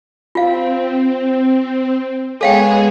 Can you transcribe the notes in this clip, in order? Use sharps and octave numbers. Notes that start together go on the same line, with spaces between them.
C4 F4 F5
G#3 B3 G#4 A4 C#5 F5 G5 G#5